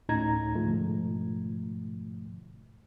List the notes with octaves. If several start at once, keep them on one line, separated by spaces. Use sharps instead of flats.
D2 A2 C#4 D#4 A#5 G#6
G#2 B2 D3 F3 A3